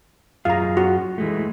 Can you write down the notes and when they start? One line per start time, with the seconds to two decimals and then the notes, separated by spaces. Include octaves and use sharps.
0.45 F#2 F4 G#4 F5 A#5
0.77 F#4
1.18 E3 G#3 A3